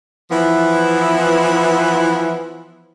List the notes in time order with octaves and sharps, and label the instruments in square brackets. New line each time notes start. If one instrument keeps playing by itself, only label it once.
[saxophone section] E3 F3 B3 E4